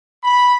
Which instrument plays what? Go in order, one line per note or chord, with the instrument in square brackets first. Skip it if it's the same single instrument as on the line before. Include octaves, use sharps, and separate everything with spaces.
[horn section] B5